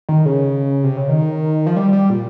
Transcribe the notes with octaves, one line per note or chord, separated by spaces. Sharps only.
D#3
C#3
C3
C#3
D#3
F3
G3
G3
A#2